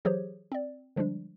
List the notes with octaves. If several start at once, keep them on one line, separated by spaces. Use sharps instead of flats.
E3 F#3 G4 G#4 C5 C#5
C4 D5
D3 F3 G3 G#3 D4